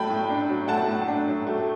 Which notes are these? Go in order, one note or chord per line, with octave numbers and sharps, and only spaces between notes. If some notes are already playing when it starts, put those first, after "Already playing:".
Already playing: A2 F#3 A3 G5 A5 B5
A2
D4
F#3
A3 F#5 A5
A2
D4
F#3
A3